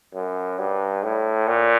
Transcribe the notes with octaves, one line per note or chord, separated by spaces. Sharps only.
F#2
G2
A2
A#2